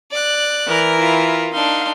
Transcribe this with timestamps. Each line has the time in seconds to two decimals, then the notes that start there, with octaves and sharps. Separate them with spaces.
0.11 D5 F#6
0.68 E3 A#4 A#5
0.97 E4 F4
1.53 D4 D#4 F5 C6